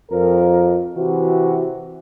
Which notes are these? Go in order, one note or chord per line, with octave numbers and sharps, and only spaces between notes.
F2 A#4
C3 E3 F#4